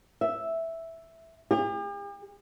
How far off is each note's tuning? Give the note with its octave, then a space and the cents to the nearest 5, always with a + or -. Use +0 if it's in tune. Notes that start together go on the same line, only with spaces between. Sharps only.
E5 -5
G4 +45